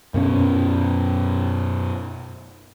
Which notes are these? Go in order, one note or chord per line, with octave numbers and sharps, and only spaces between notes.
F#2 B2 C#4